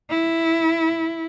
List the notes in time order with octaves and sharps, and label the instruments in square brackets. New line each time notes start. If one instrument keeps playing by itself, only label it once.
[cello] E4